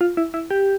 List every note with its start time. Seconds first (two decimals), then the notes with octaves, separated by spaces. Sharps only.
0.01 F4
0.17 E4
0.34 E4
0.50 G4